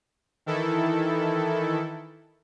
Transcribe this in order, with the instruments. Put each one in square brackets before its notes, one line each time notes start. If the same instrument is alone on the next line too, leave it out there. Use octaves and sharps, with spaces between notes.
[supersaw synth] D#3 E3 E4 A4